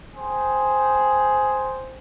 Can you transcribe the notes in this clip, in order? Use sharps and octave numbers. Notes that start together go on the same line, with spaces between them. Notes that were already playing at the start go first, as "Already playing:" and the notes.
G#4 C5 G5